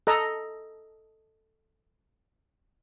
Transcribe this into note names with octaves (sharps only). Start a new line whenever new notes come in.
A4 D#5 A#5